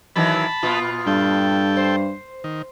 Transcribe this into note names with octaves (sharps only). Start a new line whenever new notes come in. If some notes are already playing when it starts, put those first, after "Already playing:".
D#3 E3 F#3 A5 B5
A#2 B3 F4
G2 A4 G5
C5
D#3